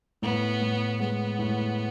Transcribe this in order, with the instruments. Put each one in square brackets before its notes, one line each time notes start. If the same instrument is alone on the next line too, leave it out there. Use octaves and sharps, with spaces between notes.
[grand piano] A2 [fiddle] B3
[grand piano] A2
[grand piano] G#3 [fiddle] B3
[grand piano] A2